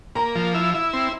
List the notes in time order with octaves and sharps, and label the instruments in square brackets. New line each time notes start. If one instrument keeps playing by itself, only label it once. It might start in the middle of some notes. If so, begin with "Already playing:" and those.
[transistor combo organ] A#3 [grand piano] A#5
[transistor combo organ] F3
E4
E4
C4